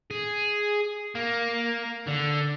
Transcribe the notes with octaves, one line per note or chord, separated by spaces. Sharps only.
G#4
A#3
D3